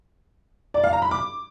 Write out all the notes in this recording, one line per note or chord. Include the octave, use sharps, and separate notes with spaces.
D5
F5
A#5
B5
D6